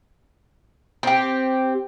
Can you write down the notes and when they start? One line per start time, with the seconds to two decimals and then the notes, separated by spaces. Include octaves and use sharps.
1.03 C4 G4